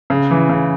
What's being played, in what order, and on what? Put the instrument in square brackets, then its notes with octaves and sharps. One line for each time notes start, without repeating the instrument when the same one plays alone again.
[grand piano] C#3
E3
C#3